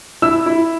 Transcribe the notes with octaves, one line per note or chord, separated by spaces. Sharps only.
E4 E6
E4